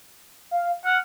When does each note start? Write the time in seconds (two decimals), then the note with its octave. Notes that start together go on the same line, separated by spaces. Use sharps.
0.51 F5
0.85 F#5 F6